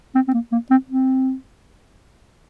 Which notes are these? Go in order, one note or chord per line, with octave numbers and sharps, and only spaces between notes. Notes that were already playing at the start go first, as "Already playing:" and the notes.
C4
C4
A#3
A#3
C4
C4